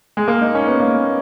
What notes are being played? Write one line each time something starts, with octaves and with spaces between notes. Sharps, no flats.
G#3
A#3
D#4
C#4
B3
A#3